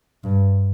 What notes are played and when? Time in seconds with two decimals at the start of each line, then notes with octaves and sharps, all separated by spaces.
0.24 G2